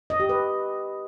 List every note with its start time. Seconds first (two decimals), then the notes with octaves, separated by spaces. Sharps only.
0.10 D#5
0.20 G4
0.29 B4